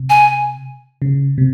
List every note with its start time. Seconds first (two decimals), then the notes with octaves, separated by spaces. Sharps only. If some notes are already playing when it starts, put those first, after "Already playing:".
Already playing: C3
0.10 G#5
1.02 C#3
1.38 C3